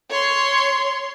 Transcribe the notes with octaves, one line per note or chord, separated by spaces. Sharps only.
C#5 C6